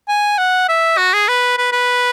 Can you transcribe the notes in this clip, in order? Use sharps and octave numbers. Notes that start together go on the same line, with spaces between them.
G#5
F#5
E5
F#4
G#4
B4
B4
B4